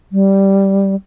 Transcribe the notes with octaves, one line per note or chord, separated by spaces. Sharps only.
G3